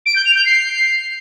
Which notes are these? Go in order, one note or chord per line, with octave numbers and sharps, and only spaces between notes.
D7
G6
F7
G6
C7